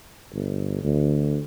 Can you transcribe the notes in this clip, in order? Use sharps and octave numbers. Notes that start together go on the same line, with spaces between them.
G1
D2